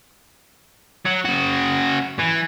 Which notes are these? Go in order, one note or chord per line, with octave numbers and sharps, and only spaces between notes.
F#3
C#3 F#4
E3